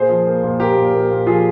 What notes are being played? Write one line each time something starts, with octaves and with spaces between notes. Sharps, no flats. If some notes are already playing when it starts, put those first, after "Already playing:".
Already playing: A#2 G#4 C5
F3
A#3
A#2
A#2 G4 A#4
A#2
A#2
A#2
F3 F4 G#4